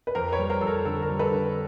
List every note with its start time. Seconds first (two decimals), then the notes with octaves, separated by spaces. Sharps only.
0.07 B4
0.15 F2 A#4 C5
0.32 B4 C#5
0.39 G3
0.50 A#4 C5
0.61 F2 A4
0.67 A#4
0.85 D3 A4
1.02 A#4
1.09 G3
1.19 A4 B4
1.31 D3